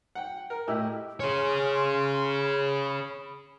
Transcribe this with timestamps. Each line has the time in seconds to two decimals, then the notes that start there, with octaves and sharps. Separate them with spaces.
0.15 F#5 G5
0.50 A#4
0.68 A2 E4 G4 D#5 E6
1.20 G#4 C#5 G#5 C6 F6
2.38 B5